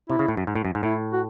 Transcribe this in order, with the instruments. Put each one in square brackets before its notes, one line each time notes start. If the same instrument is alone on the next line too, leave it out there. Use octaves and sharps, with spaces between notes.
[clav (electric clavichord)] C3 [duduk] E4
[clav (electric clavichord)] C#3
A2
F#2
G#2
A2
F#2
G#2
[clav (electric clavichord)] A2 [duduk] E4
[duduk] F#4